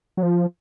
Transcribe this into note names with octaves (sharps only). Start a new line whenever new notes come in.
F#3
F3